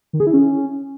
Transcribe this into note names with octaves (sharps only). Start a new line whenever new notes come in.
D#3
G#4
E4
C#4